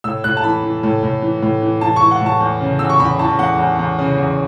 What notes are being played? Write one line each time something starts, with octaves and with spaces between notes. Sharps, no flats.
A2 E6
A2 F#6
A5
E3 B5
E3
A2
A2
E3
A2
E3
E3 A5
C#6
E3
F#5
A2
A5
E2
C#3
E2 E6
C#6
E2 B5
E3 A5
E2 F#5
E2
E2
C#3
E2